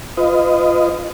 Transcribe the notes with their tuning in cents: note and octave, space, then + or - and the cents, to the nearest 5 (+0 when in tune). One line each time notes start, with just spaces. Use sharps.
F4 +0 B4 +40 D#5 +0